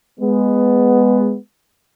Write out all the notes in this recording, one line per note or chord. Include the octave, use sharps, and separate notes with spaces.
G#3 B3